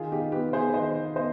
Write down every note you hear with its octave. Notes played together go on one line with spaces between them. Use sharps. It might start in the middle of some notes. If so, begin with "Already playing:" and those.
Already playing: D#3 F4 G#4
D#4 G4
B3 G4 B4
G#4 C5
D#3 C5 D#5
B3 C5 D#5